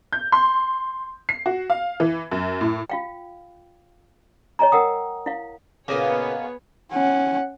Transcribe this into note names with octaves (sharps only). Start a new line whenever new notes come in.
G6
C6
C7
F#4
F5
E3
F#2
A2
F4 F5 G5
C#5 D#5 G#5 A#5
A#4 F#5 G5 D#6
E4 F5
A#2 C#3 A#3 B3 G#4 C#5 D#5 F5
C#4 F#5